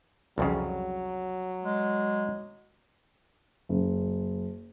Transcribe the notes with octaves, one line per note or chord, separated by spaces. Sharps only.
C2 F2 C#3 F#3
G#3
F#1